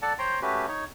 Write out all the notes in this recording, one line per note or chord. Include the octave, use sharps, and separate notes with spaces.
A4 D5 F#5 A5
C5 C#5 G5 A#5 C6
A3 C#4 F#4 G4 B4
D#4 C#5